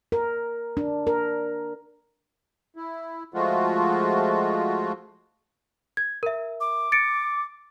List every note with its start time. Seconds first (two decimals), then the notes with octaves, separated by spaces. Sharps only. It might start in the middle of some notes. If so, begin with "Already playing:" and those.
0.12 A#4
0.77 D4
1.07 A#4
2.76 E4
3.34 F3 G#3 A3 F4 F#4
5.97 G#6
6.23 A#4 E5
6.61 D6
6.92 A6 C#7 D7